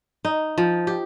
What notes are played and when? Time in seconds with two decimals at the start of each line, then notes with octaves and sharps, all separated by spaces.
0.25 D#4
0.58 F3
0.87 G4